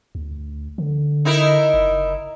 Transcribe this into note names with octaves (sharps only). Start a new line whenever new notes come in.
D2
D3
D#4 E4 A#4
F#1